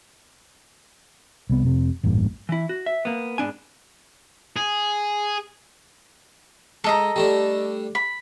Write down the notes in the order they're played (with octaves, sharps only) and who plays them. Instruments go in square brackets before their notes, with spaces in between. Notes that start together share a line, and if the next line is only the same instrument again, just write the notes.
[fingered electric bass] C2 B3
F1 C3
A1 E2 G2 A#2
[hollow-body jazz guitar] E3 E4
F#4
E5
A#3 B3
G#2 B3 D4 G#5
[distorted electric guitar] G#4
[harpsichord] G#3 [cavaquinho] A4 D#5 A#5
[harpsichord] G3 A3 D4
[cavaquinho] B5